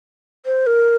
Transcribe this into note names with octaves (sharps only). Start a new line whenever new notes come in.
C5
A#4